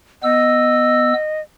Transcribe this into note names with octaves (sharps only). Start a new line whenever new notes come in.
B3 D#5 E6